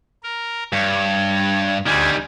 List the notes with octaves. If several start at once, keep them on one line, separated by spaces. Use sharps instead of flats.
A#4
G2 C#5
D2 D#3 G3 D5 G#5